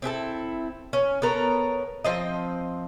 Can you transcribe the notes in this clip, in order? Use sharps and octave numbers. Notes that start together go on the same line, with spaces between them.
C4 E4 G#4 A4
C#4
B3 A4 A#4 C#5
F3 C4 D#5